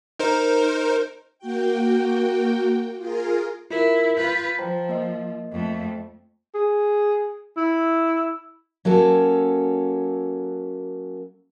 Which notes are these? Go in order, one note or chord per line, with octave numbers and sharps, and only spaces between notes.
D#4 A#4 C5
A#3 F#4 G5
F4 G#4 A#4
E4 F4 A#4
F4 B4 G6
F3 C5 G5 A#5
A#3 D#5
F2 A3
G#4
E4
F#3 A#3 C#4 A4